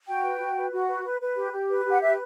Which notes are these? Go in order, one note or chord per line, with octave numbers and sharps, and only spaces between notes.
F#4 G5
B4
F#4
B4
F#4
B4
B4
B4
G4
G4
B4
G4
F#5
B4 E5